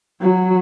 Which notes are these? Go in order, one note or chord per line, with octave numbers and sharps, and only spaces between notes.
F#3